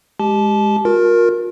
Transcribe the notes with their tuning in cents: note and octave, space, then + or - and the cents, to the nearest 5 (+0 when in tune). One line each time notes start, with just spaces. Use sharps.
G#3 -5 G4 +0 A5 -25
F4 +45 A#4 +10